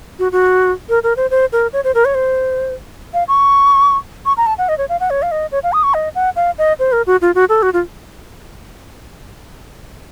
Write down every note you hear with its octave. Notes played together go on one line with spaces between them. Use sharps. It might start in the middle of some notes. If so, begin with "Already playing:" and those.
F#4
F#4
A#4
A#4
C5
C5
A#4
C#5
C5
A#4
C#5
C5
F5
C#6
C#6
A#5
A5
F#5
D#5
C#5
F5
F#5
C#5
F5
D#5
C#5
F5
D#6
C#6
D#5
F#5
F5
D#5
C5
A#4
F#4
F4
F#4
A4
F#4
F4